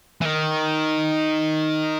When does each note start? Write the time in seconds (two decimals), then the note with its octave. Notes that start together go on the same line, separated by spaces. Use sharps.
0.21 E3
0.26 D#3